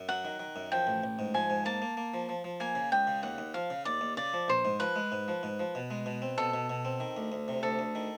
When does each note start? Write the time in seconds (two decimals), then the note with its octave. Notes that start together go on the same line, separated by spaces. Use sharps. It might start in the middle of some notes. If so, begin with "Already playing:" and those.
Already playing: F#2
0.09 F#3 F#5
0.25 D#3
0.40 D#3
0.56 F#2
0.72 F3 G5
0.87 A1
1.04 A1
1.19 G#2
1.34 F3 G#5
1.50 G#2
1.65 A#3 A5
1.82 A#3
1.97 A#3
2.14 F3
2.29 F3
2.44 F3
2.60 A#3 G#5
2.75 C#3
2.92 C#2 G5
3.07 C#3
3.23 D#2 F#5
3.38 D#2
3.54 F3 F5
3.70 C#3
3.85 D#2 D5
4.01 D#2
4.17 C#3 D5
4.33 F3
4.48 A#1 C5
4.65 G#2
4.80 F3 B4
4.96 G#3
5.12 G#2
5.28 F3
5.43 G#2
5.59 F3
5.75 B2
5.91 G#3
6.06 B2
6.22 C4
6.38 B2 A4
6.54 B2
6.70 B2
6.85 C4
7.00 D#3
7.17 D2
7.32 D2
7.48 C3
7.63 D2 A4
7.79 D2
7.95 D#3